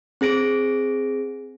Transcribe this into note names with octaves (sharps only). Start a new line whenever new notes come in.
C4 G#4 A#6 D7